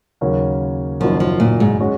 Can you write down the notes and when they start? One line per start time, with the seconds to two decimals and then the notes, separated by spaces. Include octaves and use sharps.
0.21 D#2 C#3 F#3 A#3 C#4
1.00 F#1 F#2 D#3 F3 F#3 A#3
1.20 F3
1.40 A#2
1.60 G#2
1.80 G#3 C#4 F#4